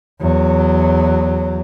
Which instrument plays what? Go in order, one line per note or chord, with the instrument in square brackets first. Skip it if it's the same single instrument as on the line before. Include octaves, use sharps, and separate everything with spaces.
[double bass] E2 F#3